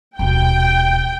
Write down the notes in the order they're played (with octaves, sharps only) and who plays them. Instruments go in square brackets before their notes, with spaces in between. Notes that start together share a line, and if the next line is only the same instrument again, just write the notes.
[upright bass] D#1 B2 [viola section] G5